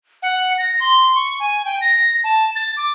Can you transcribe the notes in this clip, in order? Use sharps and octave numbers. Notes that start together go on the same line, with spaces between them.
F#5
A#6
C6
C#6
G#5
G5
A#6
A5
A6
D6